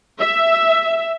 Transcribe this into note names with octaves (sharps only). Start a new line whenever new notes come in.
E5